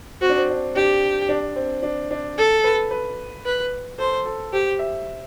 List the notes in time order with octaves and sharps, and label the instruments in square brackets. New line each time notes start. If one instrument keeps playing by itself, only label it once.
[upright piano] C4 [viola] F#4
[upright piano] D4
C4
D4
[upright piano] D4 [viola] G4
[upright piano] D4
C4
D4
D4
[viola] A4
[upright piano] B4
B4
[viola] B4
[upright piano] A4 [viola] C5
[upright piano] A4
[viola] G4 [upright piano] C5
[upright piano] E5